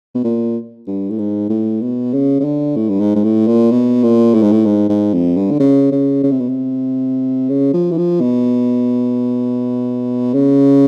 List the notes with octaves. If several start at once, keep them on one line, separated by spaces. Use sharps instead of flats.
B2
A#2
G2
A2
G#2
A2
B2
C#3
C#3
D3
A2
G2
G#2
G#2
A2
A#2
B2
A#2
A2
G#2
A2
G#2
G#2
F2
G2
D3
C#3
C#3
C#3
C3
B2
C3
C#3
F3
E3
F3
B2
C#3